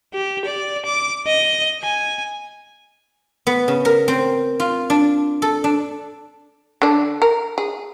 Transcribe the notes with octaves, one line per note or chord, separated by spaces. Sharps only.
G4
D5
D6
D#5
G#5
B3
C#3
A#4
C4
F4
D4
A4
D4
D3 D4
A#4
G#4